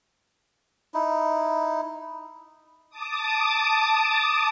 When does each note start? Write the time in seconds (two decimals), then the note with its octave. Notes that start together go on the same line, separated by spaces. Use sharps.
0.94 D#4 E4
2.90 A5 D6 D#6